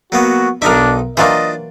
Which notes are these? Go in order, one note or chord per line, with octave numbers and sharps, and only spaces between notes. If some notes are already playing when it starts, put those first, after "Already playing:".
F#3 A#3 B3 F#4
B1 D4 D#4 A#4 E5 D6
E3 F#3 A#3 D4 F4 C5 D#5